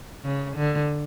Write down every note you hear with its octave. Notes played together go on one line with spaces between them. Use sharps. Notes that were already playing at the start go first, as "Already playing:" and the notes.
C#3
D3